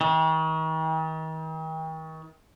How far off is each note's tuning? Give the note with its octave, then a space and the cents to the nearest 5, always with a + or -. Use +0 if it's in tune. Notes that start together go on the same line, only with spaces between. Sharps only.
D#3 +40